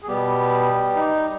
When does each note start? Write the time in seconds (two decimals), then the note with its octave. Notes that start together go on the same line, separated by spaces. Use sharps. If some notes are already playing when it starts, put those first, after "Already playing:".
0.03 G#4
0.07 B2 G3 B3 G4
0.96 D#4